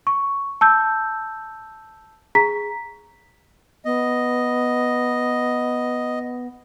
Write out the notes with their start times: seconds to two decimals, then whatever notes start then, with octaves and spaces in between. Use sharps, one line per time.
0.07 C#6
0.61 A5 E6 G6
2.35 G#4 A#5 B6
3.85 B3 D#5